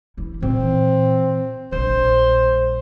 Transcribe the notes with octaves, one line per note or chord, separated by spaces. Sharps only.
E3 E4
A#2 E3 C4
A#1 G3 C5